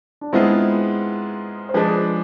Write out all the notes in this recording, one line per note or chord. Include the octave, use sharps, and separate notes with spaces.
D4
G#2 G#3 B3 C4 E4 F4 G#4
C5
F3 G#3 D4 G#4 B4